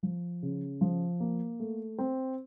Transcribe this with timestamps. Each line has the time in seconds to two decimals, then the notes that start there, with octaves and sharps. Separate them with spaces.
0.03 F3
0.42 C#3
0.81 F3
1.20 A#3
1.60 A3
1.98 C4